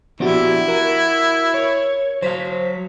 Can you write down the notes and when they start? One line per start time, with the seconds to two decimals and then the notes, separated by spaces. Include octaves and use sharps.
0.20 F3 B3 D4 E4 F#4 G4 D5
0.68 F#4 A#4
1.54 C#5
2.22 F#3 C5 F5 B6